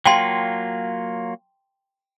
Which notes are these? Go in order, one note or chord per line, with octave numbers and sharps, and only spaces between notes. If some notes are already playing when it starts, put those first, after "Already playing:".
F#3 A#3 F4 G5 A5 C6